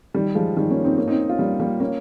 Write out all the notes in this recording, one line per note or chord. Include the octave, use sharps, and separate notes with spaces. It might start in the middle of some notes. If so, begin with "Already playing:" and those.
D#3 G3
F3 G#3
D#3 G3
A#3 C#4
C4 D#4
A#3 C#4
C4 D#4
C#4 F4
G3 A#3
G3 A#3
A#3 C#4